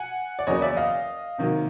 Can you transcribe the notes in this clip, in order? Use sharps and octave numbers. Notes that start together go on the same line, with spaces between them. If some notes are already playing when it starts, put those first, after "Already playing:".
Already playing: F#5 G#5
D5
E2 C#3 F#3 A#3 C#5 D#5
D5 E5
D#5 F5
C3 D#3 F#3 A#3